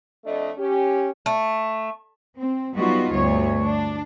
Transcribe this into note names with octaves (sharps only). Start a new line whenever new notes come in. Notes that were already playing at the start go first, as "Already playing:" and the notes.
F2 A3 D4 D#5
C#4 G4
A3
C4
F#3 G3 B3 D#4 F4 F#4
D2 G2 B3 C#5
D4